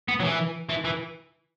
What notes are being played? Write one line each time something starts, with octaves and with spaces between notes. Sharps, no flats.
B3
F#3
E3
E3
E3